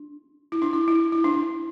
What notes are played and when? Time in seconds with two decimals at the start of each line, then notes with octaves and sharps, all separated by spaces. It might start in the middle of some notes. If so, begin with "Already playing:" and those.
Already playing: D4
0.52 E4
0.62 D4
0.73 E4
0.88 E4
1.12 E4
1.24 D4